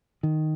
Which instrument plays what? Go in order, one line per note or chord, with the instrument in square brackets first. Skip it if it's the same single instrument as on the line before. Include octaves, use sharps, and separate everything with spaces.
[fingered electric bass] D#3